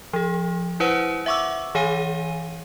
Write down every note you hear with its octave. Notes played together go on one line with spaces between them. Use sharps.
F3 G#4
E4 B4 C5 F#5 D#7
E5 F#5 C#6 D6 E6
E3 G#4 C#5 F5 G#5 D#7